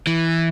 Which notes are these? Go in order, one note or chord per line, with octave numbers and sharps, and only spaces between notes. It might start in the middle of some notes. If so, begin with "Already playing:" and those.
E3